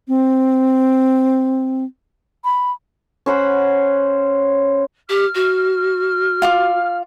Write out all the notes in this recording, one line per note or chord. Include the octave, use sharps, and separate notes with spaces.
C4
B5
C#4 C5 F#5 B5
G4 F6
F#4
F4 F5 D6